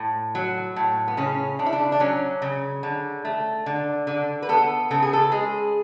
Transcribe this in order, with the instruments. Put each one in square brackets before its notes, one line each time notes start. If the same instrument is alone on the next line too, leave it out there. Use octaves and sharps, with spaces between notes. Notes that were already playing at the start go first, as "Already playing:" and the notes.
Already playing: [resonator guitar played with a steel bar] A2
F#3
A2
B3
C#3 C#4
C#3 D4
E4
D4
D4
F#3 C#4
C#3
D3
A3
D3
D3
B4
B3 A4
C#3 A4
G#4
A4
G#3 G#4